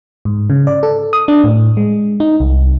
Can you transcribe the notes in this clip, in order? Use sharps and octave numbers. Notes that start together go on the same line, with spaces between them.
G#2
C#3
D5
A4
D#6
D4
A2
G#3
D#4
C2